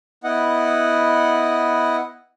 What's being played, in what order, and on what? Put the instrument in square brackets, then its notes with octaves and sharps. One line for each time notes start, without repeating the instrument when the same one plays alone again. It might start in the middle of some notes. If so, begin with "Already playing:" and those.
[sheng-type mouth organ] B3 E4 D#5 F#5